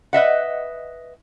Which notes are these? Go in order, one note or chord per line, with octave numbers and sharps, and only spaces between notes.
B4 D#5 E5 F#5